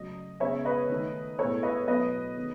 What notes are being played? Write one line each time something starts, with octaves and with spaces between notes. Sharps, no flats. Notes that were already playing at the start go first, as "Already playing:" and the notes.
Already playing: C#3 F#3 A3 D#5
C#3 G#3 B3 C#5 E5
B4 D#5
D#3 A3
A2 G#3 B3 A4 C#5
B4 D#5
B2 F#3 A3 B4 D#5
D#3 G#3 B3